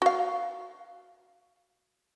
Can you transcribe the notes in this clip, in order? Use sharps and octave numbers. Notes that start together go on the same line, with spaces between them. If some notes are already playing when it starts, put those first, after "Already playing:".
F#4 F5